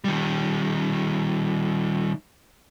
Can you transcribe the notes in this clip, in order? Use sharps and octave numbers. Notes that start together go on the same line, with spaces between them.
D#3 G3